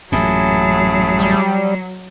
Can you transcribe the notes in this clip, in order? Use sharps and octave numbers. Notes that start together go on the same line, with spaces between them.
A1 F#2 A#2 F#3 E4 G#4 A5
G3